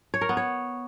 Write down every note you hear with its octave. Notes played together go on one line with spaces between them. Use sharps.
C#5
A#4
B3
C#5